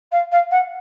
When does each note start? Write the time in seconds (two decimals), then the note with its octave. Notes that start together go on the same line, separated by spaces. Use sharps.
0.12 F5
0.32 F5
0.51 F#5